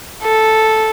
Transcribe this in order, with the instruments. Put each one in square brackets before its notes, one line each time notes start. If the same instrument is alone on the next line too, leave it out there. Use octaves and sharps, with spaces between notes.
[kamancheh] A4